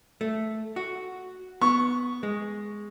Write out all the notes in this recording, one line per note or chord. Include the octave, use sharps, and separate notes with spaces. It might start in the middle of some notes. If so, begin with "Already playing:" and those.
A3
F#4
B3 C#6
G#3